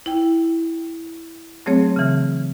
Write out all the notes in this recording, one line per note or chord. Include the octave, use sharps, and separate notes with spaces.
E4 G5
F#3 A3 C4 G#4 C#5
C#3 E3